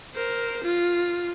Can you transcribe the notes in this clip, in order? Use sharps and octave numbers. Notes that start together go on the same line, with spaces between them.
A#4 C5
F4